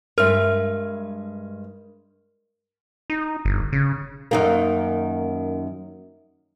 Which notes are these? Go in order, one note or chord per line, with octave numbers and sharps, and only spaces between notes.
G2 G#3 A#4 E5 F6
D#4
G1
C#3
F#2 D#3 A#3